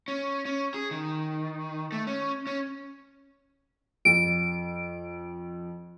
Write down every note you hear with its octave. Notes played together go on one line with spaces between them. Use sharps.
C#4
C#4
G#4
D#3
A3
C#4
C#4
F2 D7